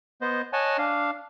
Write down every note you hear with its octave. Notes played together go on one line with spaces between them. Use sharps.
B3 C5 D#5
C#5 D#5 F#5 G#5 A5
D4 F5